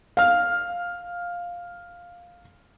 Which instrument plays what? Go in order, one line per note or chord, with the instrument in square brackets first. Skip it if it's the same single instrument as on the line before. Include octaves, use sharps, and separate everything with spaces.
[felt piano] F5 F6